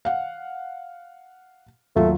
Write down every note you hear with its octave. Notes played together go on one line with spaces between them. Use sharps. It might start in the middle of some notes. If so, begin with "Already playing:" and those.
F5 F#5
D#2 F#3 A3 F4